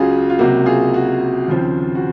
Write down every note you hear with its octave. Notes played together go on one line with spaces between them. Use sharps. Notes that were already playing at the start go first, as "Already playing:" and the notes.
Already playing: C#2 C#3 F#3 C#4 F4 F#4 G#4
F4
C#2 C3 F#3 A#3 F#4
F4 G#4
F#4
D#2 C#3 F3 C4
F#4